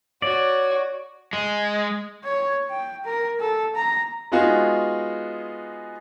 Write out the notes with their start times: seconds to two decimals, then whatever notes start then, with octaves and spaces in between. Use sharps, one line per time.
0.22 F#4 C#5 D5
1.33 G#3
2.24 C#5
2.70 G5
3.05 A#4
3.40 A4
3.76 A#5
4.32 G#3 B3 D#4 F4 F#4 G#4